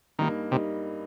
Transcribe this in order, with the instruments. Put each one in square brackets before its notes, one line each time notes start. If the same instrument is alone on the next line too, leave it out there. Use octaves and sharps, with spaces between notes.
[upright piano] G2 G3 A#3 D#4 [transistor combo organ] D#3
[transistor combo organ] C3 [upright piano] G3 A#3 D#4